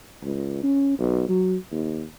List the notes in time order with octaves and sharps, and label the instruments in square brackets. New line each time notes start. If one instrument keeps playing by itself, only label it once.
[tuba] C#2
C#4
B1
F#3
D#2